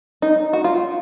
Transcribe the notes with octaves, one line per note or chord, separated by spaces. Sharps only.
D#4
F#4
F4